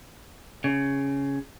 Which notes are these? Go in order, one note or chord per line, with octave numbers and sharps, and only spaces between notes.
C#3